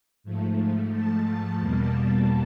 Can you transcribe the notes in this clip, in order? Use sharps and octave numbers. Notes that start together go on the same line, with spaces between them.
G#2 F3 A3
A5
E2 B2 G3 A#3 A5